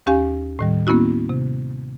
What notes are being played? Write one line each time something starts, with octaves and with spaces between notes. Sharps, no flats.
D#2 C#4 G4 F5 G#5
A2 D#3 G3
A#3 B3 C#4 E4 F#4
C3